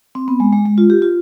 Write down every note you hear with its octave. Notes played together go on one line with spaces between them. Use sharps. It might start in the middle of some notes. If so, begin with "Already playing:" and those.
C4
B3
G#3
G#3
G#3
F4
G4
F4